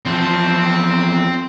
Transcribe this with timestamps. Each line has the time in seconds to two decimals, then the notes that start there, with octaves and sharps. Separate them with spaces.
0.06 E2 F3 C4